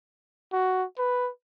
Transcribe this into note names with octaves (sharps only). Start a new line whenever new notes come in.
F#4
B4